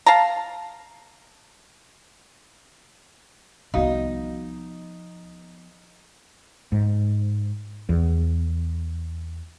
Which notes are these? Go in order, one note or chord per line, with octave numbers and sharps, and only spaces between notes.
F5 A5 A#5
C2 F3 B3 D#4 F#4 D#5 F5
G#2
E2